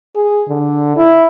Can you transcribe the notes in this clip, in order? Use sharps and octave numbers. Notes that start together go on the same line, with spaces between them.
G#4
D3
E4